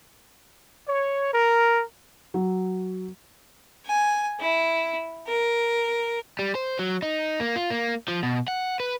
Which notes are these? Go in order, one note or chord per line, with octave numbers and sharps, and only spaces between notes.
C#5
A#4
F#3
G#5
E4
A#4
G3
C5
F#3
D#4
A#3
F4
A#3
F3
B2
F#5
B4